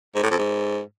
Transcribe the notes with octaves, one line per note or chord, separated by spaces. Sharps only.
G#2
A2
F2
G#2